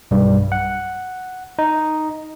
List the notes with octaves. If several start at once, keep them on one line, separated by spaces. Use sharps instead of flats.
B1 G2 G3
F#5
D#4